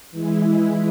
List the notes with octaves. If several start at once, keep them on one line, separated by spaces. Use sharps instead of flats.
E3 G#3 E4